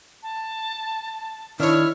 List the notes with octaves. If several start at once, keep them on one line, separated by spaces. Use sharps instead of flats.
A5
D#3 D4 E4 C#5 F6